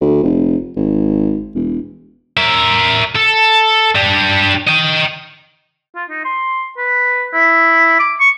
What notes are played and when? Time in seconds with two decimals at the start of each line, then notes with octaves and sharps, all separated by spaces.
0.01 D2
0.24 F1
0.76 G#1
1.55 E1
2.37 A#4 E5
3.16 A4
3.95 D4 G4
4.67 D#5 G5
5.95 F4
6.09 D#4
6.25 C6
6.77 B4
7.34 E4
8.00 D6
8.20 C#6